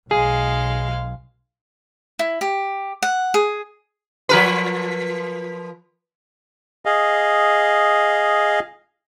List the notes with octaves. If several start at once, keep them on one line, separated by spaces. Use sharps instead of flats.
B1 G#3 G#4 F5
E4
G4
F#5
G#4
F3 A#4 B4
G#4 D#5 F5